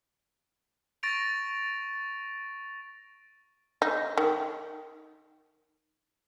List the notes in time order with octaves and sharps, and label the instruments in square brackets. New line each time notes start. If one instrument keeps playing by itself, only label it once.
[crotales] C#6 A6 A#6 D7 F7
[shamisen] D#4
D#3